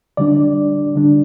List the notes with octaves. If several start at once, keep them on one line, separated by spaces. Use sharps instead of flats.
D3 G3 D4 D5
D3 G3 D4